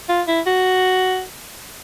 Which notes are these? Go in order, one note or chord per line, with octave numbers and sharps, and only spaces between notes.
F4
E4
F#4